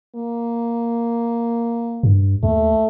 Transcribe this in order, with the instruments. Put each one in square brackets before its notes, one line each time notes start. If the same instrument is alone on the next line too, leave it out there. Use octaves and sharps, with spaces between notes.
[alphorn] A#3
[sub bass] G2
[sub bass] D#2 [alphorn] A3